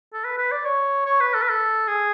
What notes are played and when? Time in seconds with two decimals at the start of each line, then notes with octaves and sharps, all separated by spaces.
0.13 A4
0.25 B4
0.38 B4
0.52 D5
0.65 C#5
1.06 C#5
1.20 B4
1.34 A4
1.42 B4
1.49 A4
1.88 G#4